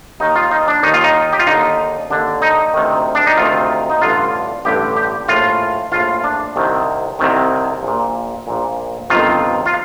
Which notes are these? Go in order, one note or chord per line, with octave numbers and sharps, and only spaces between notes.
D#2 D#3 D#4
F4
D#4
D4
D#2 D#3 D#4
F4
D#4
G4
F4
D#2 D3 D#4
D#2 D3 D4
D#4
D2 C3 D#3
D4
D#4
D2 C3 D#3 F4
D#4
A1 G2 D3 F4
A1 G2 D3 G4
G4
A#1 A2 F4
A#1 A2 F4
D4
C2 C3 D#3
C2 C3 D#3
A#1 A#2
A#1 A#2
G1 F2 C3 D#3 F4
F4